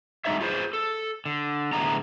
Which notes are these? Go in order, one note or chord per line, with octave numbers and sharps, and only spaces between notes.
D3 F#3 G#3 D#4 C#5 E5
F4 G#4 B4 C5
A4
D3
A2 D3 G#3 B3 D4 A#5